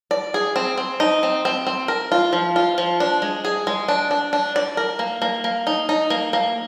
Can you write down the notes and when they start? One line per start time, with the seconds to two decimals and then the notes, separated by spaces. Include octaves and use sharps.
0.11 D5
0.34 G#4
0.56 C4
0.78 C4
1.00 D#4
1.23 C4
1.45 C4
1.67 C4
1.88 A#4
2.12 F4
2.33 F3
2.56 F4
2.78 F3
3.00 D4
3.22 G#3
3.45 G#4
3.67 G#3
3.88 D4
4.11 D4
4.33 D4
4.56 D5
4.77 A#4
4.99 A#3
5.22 A#3
5.44 A#3
5.67 D#4
5.89 D#4
6.10 A#3
6.33 A#3